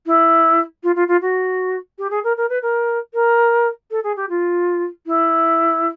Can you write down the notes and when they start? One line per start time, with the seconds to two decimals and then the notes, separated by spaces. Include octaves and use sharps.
0.06 E4
0.83 F4
0.96 F4
1.08 F4
1.22 F#4
1.98 G4
2.11 G#4
2.24 A#4
2.37 A#4
2.50 B4
2.62 A#4
3.14 A#4
3.91 A4
4.04 G#4
4.16 G4
4.30 F4
5.07 E4